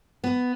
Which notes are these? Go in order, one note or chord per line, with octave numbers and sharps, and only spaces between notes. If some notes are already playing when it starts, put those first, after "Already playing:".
B3